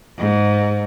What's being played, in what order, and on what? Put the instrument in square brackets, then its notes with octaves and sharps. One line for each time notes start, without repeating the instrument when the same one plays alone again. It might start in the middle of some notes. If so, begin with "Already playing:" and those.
[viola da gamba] G#2